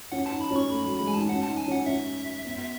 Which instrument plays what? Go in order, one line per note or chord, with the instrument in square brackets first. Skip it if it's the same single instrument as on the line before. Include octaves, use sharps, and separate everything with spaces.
[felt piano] C#4 [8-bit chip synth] F#5
[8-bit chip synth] A5
[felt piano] D#4
[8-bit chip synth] B5
[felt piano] C#4
[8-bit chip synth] C#6
[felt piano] A3 [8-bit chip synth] B5
[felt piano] F#3 [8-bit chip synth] B5
[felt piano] G#3 [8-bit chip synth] B5
[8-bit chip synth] G#5
[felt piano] D#4 [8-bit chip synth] A5
[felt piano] C#4 [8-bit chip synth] F#5
[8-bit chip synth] A5
[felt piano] D#4
[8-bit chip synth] G#5
[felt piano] C#4 [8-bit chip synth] F#5
[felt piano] C#4 [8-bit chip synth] E5
[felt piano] B3